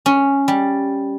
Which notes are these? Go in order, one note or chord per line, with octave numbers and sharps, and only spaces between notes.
C#4
G3